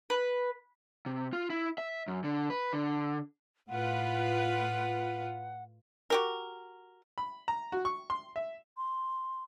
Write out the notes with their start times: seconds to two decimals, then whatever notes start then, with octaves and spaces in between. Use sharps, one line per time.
0.10 B4
1.06 C3
1.33 F4
1.50 E4
1.78 E5
2.08 F#2
2.24 D3
2.50 B4
2.73 D3
3.69 A2 F4 B4 F#5
6.10 F#4 G4 A#4
7.18 B5
7.48 A#5
7.72 F#4
7.85 C#6
8.10 C6
8.36 E5
8.77 C6